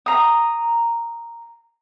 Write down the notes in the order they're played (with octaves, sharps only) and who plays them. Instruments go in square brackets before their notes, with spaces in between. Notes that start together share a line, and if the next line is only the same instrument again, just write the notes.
[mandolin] A#5 D#6